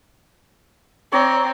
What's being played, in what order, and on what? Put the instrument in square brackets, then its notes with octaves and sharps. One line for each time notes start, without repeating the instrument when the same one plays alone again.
[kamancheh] C4 [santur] C#5 D5 A#5